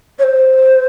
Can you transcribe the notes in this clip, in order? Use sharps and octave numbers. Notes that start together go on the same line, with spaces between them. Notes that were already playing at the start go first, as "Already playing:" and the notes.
C#5
C5